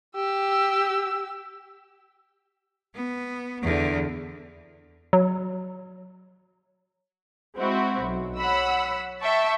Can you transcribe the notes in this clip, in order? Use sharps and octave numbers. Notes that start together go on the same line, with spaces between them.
G4 E6
B3
E2 D3
F#3
G#3 C4 E4 F#4
B1
C#5 F#5 B5 E6
E5 G5 A5 C#6